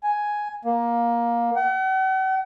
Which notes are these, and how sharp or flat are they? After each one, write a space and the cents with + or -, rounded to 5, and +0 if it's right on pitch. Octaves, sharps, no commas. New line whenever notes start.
G#5 +5
A#3 +15
F#5 +45